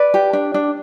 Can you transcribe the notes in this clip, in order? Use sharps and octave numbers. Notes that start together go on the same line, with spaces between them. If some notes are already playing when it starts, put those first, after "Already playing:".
Already playing: B4 D5
G4
D4
D4